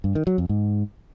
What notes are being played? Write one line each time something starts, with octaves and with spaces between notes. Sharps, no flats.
G2
D#3
F#3
F2
G#2